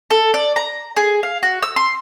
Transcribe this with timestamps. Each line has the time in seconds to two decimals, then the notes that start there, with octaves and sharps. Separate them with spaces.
0.11 A4
0.34 D5
0.56 A#5
0.97 G#4
1.23 F5
1.43 F#4
1.63 E6
1.76 C6